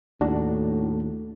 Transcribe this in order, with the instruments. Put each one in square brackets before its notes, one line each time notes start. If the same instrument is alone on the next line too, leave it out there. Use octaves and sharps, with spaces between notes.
[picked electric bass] D#2 [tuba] A2 [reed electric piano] D4 F#4